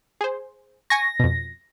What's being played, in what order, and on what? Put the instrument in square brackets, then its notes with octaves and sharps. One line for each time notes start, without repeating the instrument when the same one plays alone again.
[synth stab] G#4 C5
[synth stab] G#5 C#6 [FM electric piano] A#6
[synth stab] F2 B2